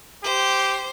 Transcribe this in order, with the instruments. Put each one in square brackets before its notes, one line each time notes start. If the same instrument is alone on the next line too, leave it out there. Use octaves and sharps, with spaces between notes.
[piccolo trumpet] G4 [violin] C5